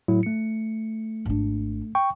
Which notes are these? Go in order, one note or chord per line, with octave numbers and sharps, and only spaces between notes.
A2 F#3 E4
A3 C#7
G#1 D4
G5 C#6